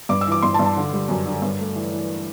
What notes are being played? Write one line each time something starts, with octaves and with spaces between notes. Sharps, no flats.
G2 D6
E6
E3 D6
G2 C6
A5
G2
A5
D3
G3
F#2
D3
G2
A3
E3
E3